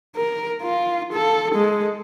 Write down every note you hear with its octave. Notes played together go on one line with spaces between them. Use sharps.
A#4
F4
A4
G#3